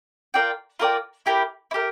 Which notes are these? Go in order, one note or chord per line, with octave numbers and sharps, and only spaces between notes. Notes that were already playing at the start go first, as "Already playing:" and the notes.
F4 A#4 D5 G5
F4 A#4 D5 G5
E4 G4 A#4
E4
G4 A#4